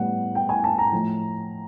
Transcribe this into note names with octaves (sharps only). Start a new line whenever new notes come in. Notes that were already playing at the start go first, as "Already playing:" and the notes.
Already playing: A2 E3 G3 B3 F#5
G5
G#5
A5
A#5
A2 F3 A3